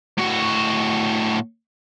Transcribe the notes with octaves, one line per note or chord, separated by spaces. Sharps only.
A2 F#4